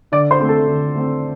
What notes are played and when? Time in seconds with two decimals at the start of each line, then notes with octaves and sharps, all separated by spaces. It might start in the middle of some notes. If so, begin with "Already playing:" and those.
0.12 D3 D5 D6
0.31 C5 C6
0.40 A3 C4
0.49 A4 A5
0.67 D3
0.95 A3 C4